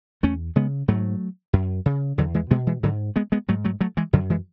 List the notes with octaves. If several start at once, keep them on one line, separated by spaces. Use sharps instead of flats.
E2 A3 C#4
C#3 G#3 B3
G#2 F#3 A3
F#2
C#3
E2 D3 F#3
E3 G#3
B2 G#3 B3
E3 G#3
G#2 D3 F#3
G#3 B3
G#3 B3
G#2 F#3 A3
F#3 A3
F#3 A3
E3 G#3
F#2 D3 F#3
E3 G#3